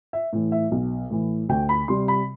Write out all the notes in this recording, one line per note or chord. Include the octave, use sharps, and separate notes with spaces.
E5
A2 E3
E5
B1
A2 E3
D2 G5
B5
C3 G3 C6
B5